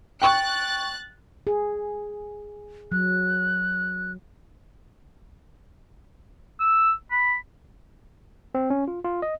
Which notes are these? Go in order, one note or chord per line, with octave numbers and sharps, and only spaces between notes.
G5 C#6 F#6 A6
G#4
F#3 F#6
E6
B5
C4
C#4
F4
F4
D#5